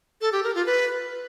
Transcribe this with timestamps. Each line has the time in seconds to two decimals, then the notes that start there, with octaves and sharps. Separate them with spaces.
0.21 A4
0.33 G4
0.44 A#4
0.55 F4
0.66 B4